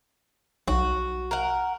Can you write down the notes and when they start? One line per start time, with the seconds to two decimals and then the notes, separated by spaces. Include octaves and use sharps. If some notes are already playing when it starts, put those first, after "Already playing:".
0.68 B1 F#4
1.31 A#4 F#5